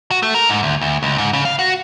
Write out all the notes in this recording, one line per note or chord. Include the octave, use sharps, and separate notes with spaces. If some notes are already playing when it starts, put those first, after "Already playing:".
F#4
A3
A#4
G#2
D2
D2
C#2
G#2
C#3
F5
F#4